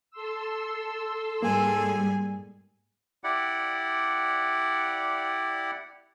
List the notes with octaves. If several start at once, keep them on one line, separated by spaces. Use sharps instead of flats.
A4 C6 E6
G#2 G3 A#3 G#4 G#5
E4 G4 D5 F#5